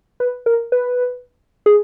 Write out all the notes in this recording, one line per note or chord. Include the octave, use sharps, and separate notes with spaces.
B4
A#4
B4
G#4